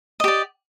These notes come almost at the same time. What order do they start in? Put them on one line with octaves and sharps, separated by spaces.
D#5 G4 D5